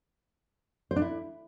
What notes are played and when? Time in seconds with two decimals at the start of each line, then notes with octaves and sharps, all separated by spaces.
0.91 C5
0.96 D4
1.02 E4